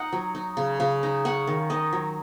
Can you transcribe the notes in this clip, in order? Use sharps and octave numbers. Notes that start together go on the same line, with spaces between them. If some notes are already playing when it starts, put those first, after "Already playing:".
Already playing: D#4 D#5 F#5
F#3
D#4
C#3
C#3
D#4
C#4 F#5
D#3
D#3 D#5
F#3